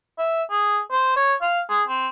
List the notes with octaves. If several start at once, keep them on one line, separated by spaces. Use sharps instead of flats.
E5
G#4
C5
C#5
F5
G#4
C4